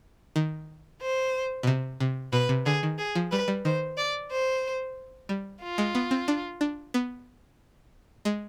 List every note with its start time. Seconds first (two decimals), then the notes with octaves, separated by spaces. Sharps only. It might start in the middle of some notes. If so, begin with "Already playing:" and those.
0.36 D#3
1.01 C5
1.63 B2
1.67 C3
2.00 C3
2.33 B2 B4
2.49 C3
2.66 D3 G#4
2.83 D#3
2.98 G#4
3.15 F3
3.31 G3 B4
3.48 G3
3.65 D#3 C5
3.97 D5
4.31 C5
5.29 G3
5.62 F4
5.78 G#3
5.95 B3
6.11 C4
6.28 D4
6.61 D4
6.94 B3
8.25 G#3